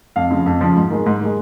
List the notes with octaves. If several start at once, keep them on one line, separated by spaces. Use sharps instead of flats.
F2 F5
C#3 F3
F2
C#3 F3
G#2
D#3 G#3
G#2
D#3 G#3